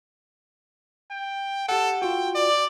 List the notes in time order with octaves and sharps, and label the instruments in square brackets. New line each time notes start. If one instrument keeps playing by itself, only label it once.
[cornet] G5
[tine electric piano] G4 F#5 [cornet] A4
[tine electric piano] F4 F#4 [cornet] G5
[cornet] D5